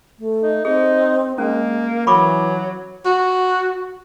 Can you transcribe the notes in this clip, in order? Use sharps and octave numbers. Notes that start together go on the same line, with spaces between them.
A3
D#4
C4 D#4 G#4
G#3 A#3 C#4
E3 F#3 B5 C#6 D6
F#4